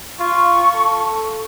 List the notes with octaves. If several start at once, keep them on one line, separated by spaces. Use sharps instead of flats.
F4 C#6
A4